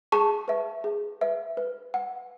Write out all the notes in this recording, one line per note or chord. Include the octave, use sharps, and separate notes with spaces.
G#4 A5 C#6
B4 E5
G#4
B4 E5
B4
F#5